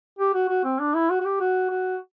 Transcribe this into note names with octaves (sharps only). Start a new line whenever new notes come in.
G4
F#4
F#4
C4
D4
E4
F#4
F#4
G4
F#4
F#4